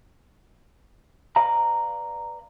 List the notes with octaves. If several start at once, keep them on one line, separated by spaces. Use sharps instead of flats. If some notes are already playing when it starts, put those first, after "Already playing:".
B4 D5 F5 A#5